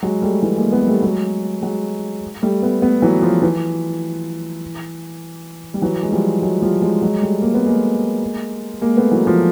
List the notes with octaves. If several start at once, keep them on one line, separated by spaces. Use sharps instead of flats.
F#3 G#3
G3 A3
E3 F#3
G#3 A#3
A3 B3
G#3
G3 A3
F#3 G#3
F#3 G#3
G3 A3
A3 B3
A3 B3
E3 F#3
F3
E3
G3
E3 F#3
G#3
F3 G3
F#3 G#3
F3 G3
F#3 G#3
F#3 G#3
G3 A3
A#3
B3
G#3 A#3
G#3 A#3
A3 B3
E3 F#3
F3